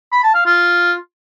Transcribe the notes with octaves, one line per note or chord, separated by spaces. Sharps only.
B5
A5
F5
F4